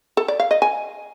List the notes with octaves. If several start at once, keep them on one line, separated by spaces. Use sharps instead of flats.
A4
D5
F5
D#5
G#5